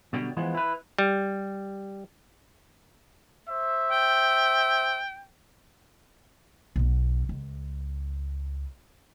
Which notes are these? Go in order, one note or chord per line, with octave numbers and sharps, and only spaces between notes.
B2 D3 F#3 G3
E3 F3 G#3 B3
E4 B4
G3
C5 E5
G5
B1 B3
C#2